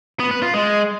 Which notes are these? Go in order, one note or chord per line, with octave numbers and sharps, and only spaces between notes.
B3
B4
F4
G#3